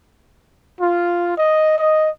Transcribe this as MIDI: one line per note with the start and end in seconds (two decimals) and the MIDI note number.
0.79 1.32 65
1.36 1.77 75
1.78 2.09 75